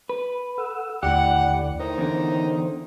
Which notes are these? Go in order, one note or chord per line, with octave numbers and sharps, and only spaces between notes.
B4
A4 F#5 E6
D#2 A2 D3 G4 D5 F#5
A2 D#3 D#4 C5
E2 D3